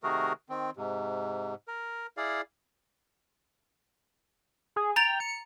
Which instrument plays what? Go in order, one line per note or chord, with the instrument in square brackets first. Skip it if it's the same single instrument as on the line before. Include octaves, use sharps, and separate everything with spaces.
[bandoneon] C3 D#3 A3 F#4 G#4 A#4
D#3 C4
G#2 C3
A#4
E4 G#4 D5 F5
[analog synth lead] G#4
[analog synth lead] G5 [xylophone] A#5 A6 F7
[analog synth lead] C#7